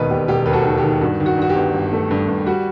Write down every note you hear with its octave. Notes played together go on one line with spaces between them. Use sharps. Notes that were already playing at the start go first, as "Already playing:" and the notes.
Already playing: E1 D#2 D#3 B4 D#5
E1 G4
E1 G4
D#2 B4
F#4 A4
D#3
G4
D#3
G2 F#4
D#3
F#4
G2 F#4
G4
G1
G1
A3
G2
G2
G3 F#4